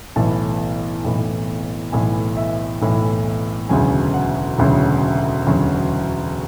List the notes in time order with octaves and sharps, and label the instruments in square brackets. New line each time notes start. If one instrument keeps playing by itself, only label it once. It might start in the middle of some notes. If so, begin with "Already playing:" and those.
[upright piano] B1 A2 E3 A5
B1 A2 E3
B1 A2 E3 G#5
E5
B1 A2 E3
E1 D2 C#3 F#3 G#5
F#5
E1 D2 C#3 F#3
E1 D2 C#3 F#3